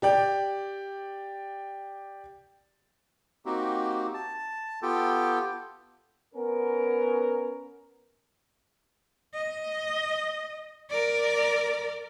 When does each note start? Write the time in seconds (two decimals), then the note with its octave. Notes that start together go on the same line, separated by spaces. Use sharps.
0.02 G4 D5 G5
3.46 A#3 C4 D#4 F#4 G4
4.14 A5
4.82 B3 F4 G4 A4 G5
6.35 B3 C#4 A#4
9.34 D#5
10.90 A#4 D5